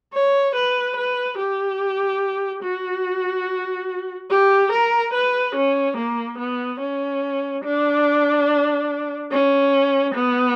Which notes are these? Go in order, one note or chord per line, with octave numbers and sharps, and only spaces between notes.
C#5
B4
B4
G4
F#4
G4
A#4
B4
C#4
A#3
B3
C#4
D4
C#4
B3